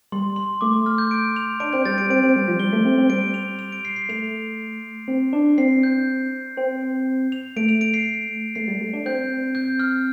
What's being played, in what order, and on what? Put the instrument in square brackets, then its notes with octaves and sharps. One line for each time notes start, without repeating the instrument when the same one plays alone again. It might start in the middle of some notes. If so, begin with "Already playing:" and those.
[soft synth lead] G3 [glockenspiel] C6
[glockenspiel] C6
[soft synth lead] A3 [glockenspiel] D6
[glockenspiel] D6
F6
G6
D7
F7
[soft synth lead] D4 [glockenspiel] D7
[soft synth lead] C4 [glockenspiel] G6
[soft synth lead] G3 [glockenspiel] A6
[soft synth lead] G3 [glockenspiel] D7
[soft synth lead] C4 [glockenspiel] D7
[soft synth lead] C4
G3
F3
[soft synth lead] G3 [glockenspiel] G7
[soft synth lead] A3
C4
C4
[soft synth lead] G3 [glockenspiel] D7
[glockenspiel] F7
F7
D7
C7
C7
[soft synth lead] A3 [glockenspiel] F7
[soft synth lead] C4
D4
[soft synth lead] C4 [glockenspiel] C7
[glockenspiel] G6
[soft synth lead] C4
[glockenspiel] F7
[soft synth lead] A3 [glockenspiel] D7
[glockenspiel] F7
D7
C7
[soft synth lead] A3 [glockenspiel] C7
[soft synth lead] G3
A3
D4
[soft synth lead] C4 [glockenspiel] G6
[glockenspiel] G6
F6